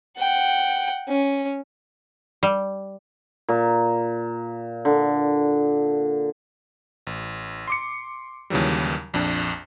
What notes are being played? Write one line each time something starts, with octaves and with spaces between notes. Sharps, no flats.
F#5 G5
C#4
G3
A#2
D3
A1
C6 D6 C#7
D#2 C#3 E3 F#3 G3
A#1 F2 D4